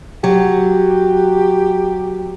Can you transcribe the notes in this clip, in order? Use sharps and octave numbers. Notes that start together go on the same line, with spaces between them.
F#3 G4